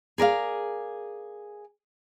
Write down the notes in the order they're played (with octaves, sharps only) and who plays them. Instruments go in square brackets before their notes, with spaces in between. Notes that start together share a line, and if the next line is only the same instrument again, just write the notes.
[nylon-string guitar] G#4 A#4 D5 F5